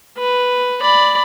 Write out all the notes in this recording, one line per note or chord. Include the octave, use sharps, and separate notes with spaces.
B4
D5 B5